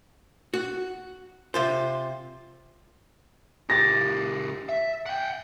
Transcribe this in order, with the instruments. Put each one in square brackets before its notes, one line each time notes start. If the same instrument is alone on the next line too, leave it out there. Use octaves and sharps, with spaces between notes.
[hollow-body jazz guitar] F#4
C3 F4 C5
[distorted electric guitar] C#2 G4 [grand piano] A6 A#6
[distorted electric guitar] E5
F#5 G5